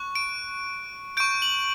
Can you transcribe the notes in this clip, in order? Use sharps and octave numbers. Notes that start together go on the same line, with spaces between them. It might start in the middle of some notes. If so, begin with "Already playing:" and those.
Already playing: C#6 F#6
D7
C#6 G6 D7
F#7